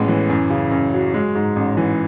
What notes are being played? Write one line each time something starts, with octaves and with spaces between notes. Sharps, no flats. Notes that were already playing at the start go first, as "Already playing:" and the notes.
Already playing: A1 A2 G#3 B3
E3
F#2
C#3
F#2
F#3
G#3
G#2
A1
E3